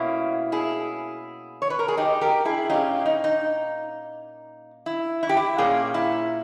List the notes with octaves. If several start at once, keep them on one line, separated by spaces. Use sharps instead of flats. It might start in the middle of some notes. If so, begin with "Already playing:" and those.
Already playing: B2 A#3 C#4 E4
E4 G#4
C#5
B4
A#4
G#4
D#4 G4
G4 A#4
E4 G#4
A#2 A#3 C#4 D#4 G4
D#4
D#4
E4
E4
G4
E4
A#2 A#3 C#4 G#4
E4